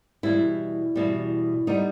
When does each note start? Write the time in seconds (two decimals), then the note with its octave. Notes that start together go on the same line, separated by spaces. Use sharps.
0.23 E2 B2 G3 E4
0.96 E2 B2 G3
1.67 G3 B3 D#4